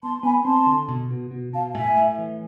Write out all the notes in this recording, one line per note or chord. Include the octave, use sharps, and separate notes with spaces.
B3 A5 C6
B3 G#5 B5
C4 A5 C6
D3
B2
B2
B2
B2 F5 A5
A2 E5 G#5
A2
E3